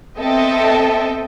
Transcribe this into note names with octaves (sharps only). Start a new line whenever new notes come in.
B3 C4 A4 D#5 E5 G5